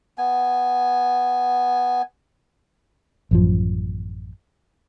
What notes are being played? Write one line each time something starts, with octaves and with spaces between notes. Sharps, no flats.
B3 G#5
A1 F#2 F3